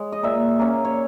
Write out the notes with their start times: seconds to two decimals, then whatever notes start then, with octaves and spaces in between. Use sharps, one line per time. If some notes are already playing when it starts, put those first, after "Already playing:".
Already playing: G#3 C#5
0.12 D#5
0.23 A#2 E5
0.59 A#3 C#4
0.85 C#5